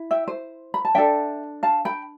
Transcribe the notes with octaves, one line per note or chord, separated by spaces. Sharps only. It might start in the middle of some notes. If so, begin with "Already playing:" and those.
Already playing: E4
E5 G5
C5
B5
A5
D4 A4 E5 G5
F5 A5
G5 B5